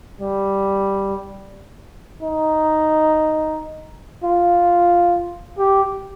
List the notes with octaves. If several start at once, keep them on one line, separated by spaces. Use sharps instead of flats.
G3
D#4
F4
G4